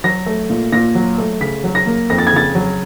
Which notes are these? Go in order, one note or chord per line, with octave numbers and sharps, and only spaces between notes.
F#3 A#6
A3
A#2
A#2 A#6
F#3
A3
C#3 B6
F#3
A#6
A#3
F2 A#6
A6
G#6
C#3 A6
F#3